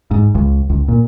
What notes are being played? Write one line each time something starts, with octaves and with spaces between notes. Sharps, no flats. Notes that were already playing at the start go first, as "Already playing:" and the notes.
G#2
C#2
C#2
A#2